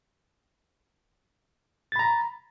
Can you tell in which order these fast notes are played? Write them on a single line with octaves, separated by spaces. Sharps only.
A6 B5 A#5